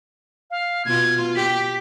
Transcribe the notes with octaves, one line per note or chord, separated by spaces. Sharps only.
F5
B2 F4 G#6
G4 B6